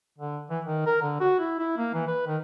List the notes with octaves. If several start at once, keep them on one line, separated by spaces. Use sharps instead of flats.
D3
E3
D#3
A#4
D3
F#4
E4
E4
A#3
E3
B4
D#3